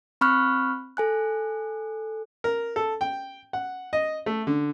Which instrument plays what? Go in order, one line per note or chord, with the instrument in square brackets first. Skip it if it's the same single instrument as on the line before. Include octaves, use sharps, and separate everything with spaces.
[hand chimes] C4 B5 C#6 F6 F#6
A4 G#5 F#6
[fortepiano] A#4
A4
G5
F#5
D#5
A3
D3